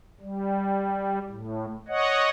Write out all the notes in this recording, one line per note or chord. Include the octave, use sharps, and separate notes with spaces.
G3
A2
C#5 D#5 F#5